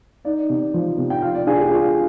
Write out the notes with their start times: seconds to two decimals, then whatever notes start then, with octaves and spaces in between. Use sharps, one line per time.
0.25 D#4 D5
0.49 C3
0.74 F3
0.98 C3
1.10 G5
1.22 F4 F5
1.34 D5
1.47 D4 G#4
1.59 G4
1.71 F4 G#4